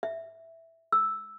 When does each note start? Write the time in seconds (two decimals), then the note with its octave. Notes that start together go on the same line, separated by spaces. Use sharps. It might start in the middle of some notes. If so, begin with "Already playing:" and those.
0.03 E5
0.92 E6